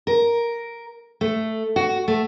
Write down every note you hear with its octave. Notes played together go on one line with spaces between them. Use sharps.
A#4
A3
F#4
A3